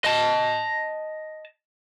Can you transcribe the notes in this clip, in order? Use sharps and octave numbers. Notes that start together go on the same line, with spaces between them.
D#5 A5